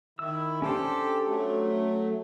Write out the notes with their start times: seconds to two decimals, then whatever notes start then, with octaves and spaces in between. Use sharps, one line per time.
0.19 D#3 E4 E6
0.62 C#4 D4 G4 A4 C5
1.26 F#3 A3